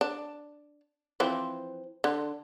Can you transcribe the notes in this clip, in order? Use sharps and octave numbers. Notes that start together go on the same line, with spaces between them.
D4
E3 F3 C4
D3